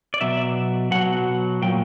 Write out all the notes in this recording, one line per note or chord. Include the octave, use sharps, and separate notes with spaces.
D5
B2 F#3 E5
B2 F#3 F#5
A#2 F#3 G5